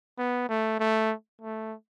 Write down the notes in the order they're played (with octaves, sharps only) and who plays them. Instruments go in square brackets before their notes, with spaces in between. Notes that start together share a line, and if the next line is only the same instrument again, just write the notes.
[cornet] B3
A3
A3
A3